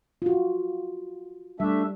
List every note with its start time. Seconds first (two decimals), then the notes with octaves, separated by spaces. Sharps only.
0.22 F4 F#4
1.60 G3 A3 D4 E5